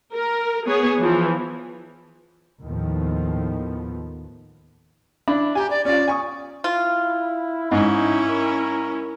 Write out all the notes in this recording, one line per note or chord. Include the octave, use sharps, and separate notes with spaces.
A#4
B3 G#4 C#5
E3 F3
D#2 A2 D#3 F3 B3
D4 E4 B5
G4 G#5 A#5
D5
C#4 F4 D5
G#5 C#6 D#6
E4 F4
G#2 C#4 D#4 E4
A#4